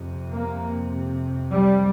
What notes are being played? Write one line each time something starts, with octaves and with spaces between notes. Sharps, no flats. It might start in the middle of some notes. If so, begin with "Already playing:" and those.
Already playing: F2 C3
A#3
G3